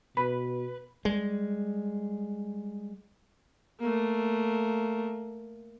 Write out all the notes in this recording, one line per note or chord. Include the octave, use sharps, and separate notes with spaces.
B2 B4 B5
G3 G#3
A3 A#3